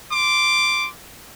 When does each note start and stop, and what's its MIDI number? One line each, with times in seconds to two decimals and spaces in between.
0.11 0.88 84
0.11 0.88 86